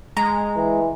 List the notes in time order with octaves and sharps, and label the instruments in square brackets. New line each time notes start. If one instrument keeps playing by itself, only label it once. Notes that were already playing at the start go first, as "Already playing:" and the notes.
[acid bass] G#3 [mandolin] A#5
[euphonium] E3